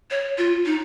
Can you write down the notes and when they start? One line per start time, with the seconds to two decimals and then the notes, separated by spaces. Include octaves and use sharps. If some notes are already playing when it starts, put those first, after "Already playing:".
0.11 C#5
0.38 F4
0.66 D#4